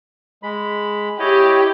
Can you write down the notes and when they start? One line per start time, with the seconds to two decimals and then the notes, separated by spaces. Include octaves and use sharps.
0.43 G#3 B5
1.20 E4 G4 C#5 D#5